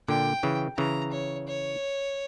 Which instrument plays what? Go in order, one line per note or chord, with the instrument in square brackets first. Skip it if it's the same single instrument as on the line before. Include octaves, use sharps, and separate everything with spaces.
[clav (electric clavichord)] A#2 D3 [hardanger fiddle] G5
[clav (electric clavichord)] C#3 E3
[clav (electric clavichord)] C#3 E3 [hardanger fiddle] A#5
[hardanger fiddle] C#5
C#5